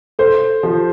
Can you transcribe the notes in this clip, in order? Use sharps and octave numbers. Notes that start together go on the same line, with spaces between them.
A4 C5
F3 G4